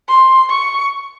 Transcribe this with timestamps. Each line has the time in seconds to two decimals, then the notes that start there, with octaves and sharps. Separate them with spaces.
0.08 C6
0.50 C#6